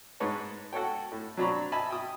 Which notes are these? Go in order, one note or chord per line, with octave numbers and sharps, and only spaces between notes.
G#2 B4 C#5 A5
F#4 A4 C#5 G5
A2
F#3 C4 D4 A#5 B5 C#6
D#5 E5 G#5 A5 B5
G5 D#6